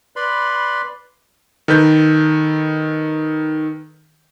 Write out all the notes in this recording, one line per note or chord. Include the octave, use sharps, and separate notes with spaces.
B4 D5 B5 C6
D#3 A4 B4 G6